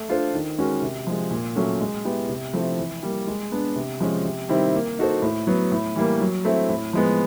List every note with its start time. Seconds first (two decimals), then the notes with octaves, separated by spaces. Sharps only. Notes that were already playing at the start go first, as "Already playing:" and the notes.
Already playing: A3
0.09 D4 F4 A4 C5
0.34 D#3
0.58 G#3 C#4 F#4 A#4
0.82 C3
1.07 F3 G#3
1.31 A#2
1.56 F#3 A3 C#4 F#4
1.80 G#3
2.05 B3 E4 G4
2.29 C3
2.53 F3 A3 C4 E4
2.78 E3
3.03 G3 A#3
3.27 G#3
3.52 B3 D4
3.76 C3
4.00 F3 G#3 C#4
4.25 C3
4.49 D#3 G3 C4 E4
4.74 A#3
4.99 D#4 F#4 A4 C5
5.22 A2
5.47 F#3 B3
5.72 A2
5.95 E3 G3 A#3
6.21 F#3
6.45 A3 C4 E4
6.69 A2
6.93 F3 G#3 B3